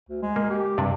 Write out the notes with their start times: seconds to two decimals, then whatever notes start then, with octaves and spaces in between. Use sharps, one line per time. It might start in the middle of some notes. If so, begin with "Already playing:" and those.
0.09 D2
0.22 G#3
0.36 A#3
0.50 G4
0.78 G2 C3 D5